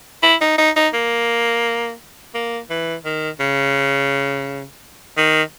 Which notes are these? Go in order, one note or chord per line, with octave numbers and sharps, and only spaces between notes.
E4
D#4
D#4
D#4
A#3
A#3
E3
D#3
C#3
D#3